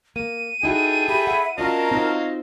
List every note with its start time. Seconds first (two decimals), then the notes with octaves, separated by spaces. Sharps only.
0.16 A#3 D#7
0.63 D#4 E4 F#4 G#4 A4 G5
1.09 G4 E5 B5
1.27 F#5
1.58 F#3 C#4 D4 F4 A#4 D#5 F5 A5
1.91 C4 D#4 F4